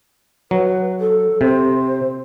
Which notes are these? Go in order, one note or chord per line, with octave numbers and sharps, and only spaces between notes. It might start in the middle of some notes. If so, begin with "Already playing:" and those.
F#3 B4
A4
C3 C5